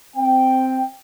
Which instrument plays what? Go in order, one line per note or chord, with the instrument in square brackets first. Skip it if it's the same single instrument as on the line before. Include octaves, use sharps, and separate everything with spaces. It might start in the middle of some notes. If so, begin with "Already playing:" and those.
[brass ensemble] C4 G5